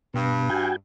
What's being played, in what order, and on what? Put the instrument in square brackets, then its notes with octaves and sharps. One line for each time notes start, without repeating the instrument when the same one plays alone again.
[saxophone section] G2 [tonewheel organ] B2
[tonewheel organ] F#4 G5 G#5